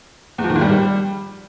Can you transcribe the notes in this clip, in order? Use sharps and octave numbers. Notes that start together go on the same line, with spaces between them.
E2
F3
D#3
G#2
G3